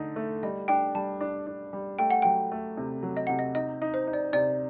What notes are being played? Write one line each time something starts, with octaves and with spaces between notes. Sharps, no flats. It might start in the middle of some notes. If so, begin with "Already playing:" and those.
Already playing: D3 A3 D#4
A3
G3 D#5
D4 G5
G3 A5
D4
D4
G3
A3 G5
F#5
F#3 G5
A3
C3
F#3
D#5
C3 F#5
D#5
D#4 D#5
D#4
C5
D#4
D5
C3 D5